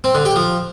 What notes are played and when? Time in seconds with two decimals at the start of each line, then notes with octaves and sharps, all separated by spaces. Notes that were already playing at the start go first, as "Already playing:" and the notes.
0.04 C4
0.15 D3
0.25 G4
0.36 F3